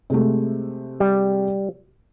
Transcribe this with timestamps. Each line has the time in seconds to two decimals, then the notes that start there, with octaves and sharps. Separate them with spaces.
0.10 C3 G#3 A3
1.00 G3